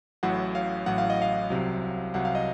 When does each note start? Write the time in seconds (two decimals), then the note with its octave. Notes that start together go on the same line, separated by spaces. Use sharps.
0.23 A1 A2 F#3 F#5
0.55 F5
0.86 A1 A2 F#3 F#5
0.98 F5
1.10 D#5
1.22 F5
1.50 C2 C3 F#3
2.14 C2 C3 F#3 F#5
2.25 F5
2.35 D#5